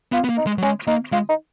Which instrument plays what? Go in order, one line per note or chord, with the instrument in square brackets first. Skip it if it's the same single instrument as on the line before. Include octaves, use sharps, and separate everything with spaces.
[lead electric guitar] B3 [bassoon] F4
[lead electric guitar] B3
A#3
[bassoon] D#4
[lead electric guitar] G#3
F#3
[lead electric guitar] G#3 [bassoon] C#4
[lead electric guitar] A#3 [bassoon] D#4
[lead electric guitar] G#3 [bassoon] F4
[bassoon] D#4